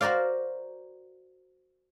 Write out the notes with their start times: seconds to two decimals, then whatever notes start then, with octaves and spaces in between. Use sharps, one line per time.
0.01 F#4 A#4 C5 D5 F5